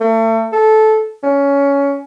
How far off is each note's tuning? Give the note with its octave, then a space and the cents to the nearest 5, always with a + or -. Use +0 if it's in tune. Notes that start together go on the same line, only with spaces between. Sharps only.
A3 +35
A4 -15
C#4 +15